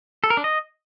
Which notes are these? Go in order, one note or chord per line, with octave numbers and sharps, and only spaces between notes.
A4
A#4
D4
D#5